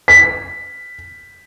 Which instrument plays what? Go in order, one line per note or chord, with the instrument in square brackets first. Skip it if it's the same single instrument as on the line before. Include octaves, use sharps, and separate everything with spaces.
[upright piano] B6